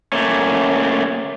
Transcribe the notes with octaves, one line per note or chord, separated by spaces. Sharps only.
A3 A#3 C#4